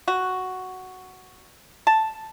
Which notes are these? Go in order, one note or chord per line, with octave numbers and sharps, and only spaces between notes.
F#4
A5